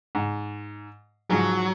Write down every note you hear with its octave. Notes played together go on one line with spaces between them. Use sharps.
G#2
G#2 F3 F#3 G#4